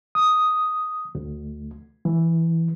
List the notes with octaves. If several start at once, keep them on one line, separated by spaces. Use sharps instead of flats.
D#6
D2
E3